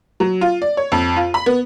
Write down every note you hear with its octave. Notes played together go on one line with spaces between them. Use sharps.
F#3
F4
D5
C#5
F2
F4
B5
B3